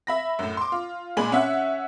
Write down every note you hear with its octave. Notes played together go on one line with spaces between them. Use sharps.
E5 B5 A#6
F#2 A2
C6 D6
F4
A#2 G#3 G#5 B5 F#7
C#4 E5 F#5